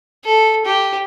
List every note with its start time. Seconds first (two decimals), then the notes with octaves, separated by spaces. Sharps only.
0.25 A4
0.65 G4